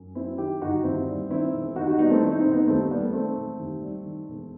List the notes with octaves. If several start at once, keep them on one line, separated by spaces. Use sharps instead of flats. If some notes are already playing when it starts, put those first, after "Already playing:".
Already playing: F#2
F#3 C4 E4
D#3 E4 G4
G1 D#4 F#4
D#2 C4 E4
G3
D#3 C4 E4
E1
D#2 D#4 F#4
D#4 F#4
G3 B3 D#4
A3 C4
D#3 E4
D#4
E1 C4
B3 D#4
D#2 A3 C4
G3 B3
A3
D#3 A3 C4
E1
D#2
G3
D#3
E1